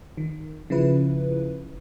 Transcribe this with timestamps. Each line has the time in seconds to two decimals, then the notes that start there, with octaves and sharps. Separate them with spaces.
0.17 D#3
0.70 C#3 F3 E4 B4